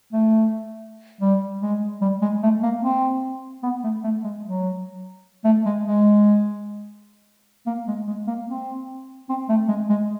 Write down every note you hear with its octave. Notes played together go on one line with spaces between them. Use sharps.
A3
G3
G#3
G3
G#3
A3
A#3
C4
B3
A3
A3
G#3
F#3
A3
G#3
G#3
A#3
G#3
G#3
A#3
C4
C4
A3
G#3
G#3